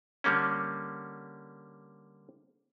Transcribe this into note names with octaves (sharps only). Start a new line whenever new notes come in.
D3 G3 A#3 C#4